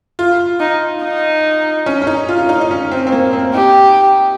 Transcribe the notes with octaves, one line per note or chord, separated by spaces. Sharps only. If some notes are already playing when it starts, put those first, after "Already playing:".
F4
D#4
D#4
C#4
C#4
D#4
F4
F4
D#4
D#4
C#4
C4
C4
A#3
C4
D#4 G4